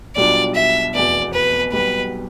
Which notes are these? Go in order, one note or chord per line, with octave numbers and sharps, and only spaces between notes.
B1 B2 G3 D4 F4 D5
E5
F1 E2 B2 D5
B4
B1 B2 G3 B4